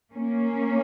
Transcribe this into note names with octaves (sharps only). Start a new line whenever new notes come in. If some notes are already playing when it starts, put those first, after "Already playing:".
A#3 C#4